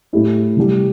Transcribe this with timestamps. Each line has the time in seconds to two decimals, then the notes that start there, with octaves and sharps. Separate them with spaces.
0.13 A2 A3 E4 G4
0.57 C3 E3 G3